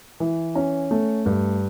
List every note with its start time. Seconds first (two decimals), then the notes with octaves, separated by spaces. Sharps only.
0.20 E3
0.55 C#4
0.91 A3
1.26 G2